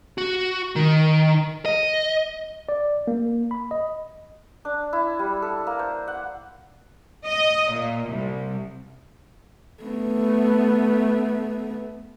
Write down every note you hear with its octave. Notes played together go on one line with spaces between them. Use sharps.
F#4
D#3
D#5
D5
A#3
B5
D#5
D4
E4
G3
A4
A#3
C5
F#5
D#5
A#2
C2
A3 B3